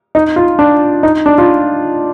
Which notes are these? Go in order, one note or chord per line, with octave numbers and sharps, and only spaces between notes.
D#4
F4
D4
D#4
D4
F4